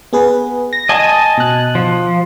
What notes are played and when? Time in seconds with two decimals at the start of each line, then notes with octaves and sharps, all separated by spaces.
0.13 B3 G#4 B4
0.73 A#6
0.89 D#5 G#5 A5
1.37 B2 F#6
1.75 F3